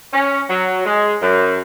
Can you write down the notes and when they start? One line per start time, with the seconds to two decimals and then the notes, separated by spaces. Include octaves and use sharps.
0.13 C#4
0.50 F#3
0.86 G#3
1.21 F#2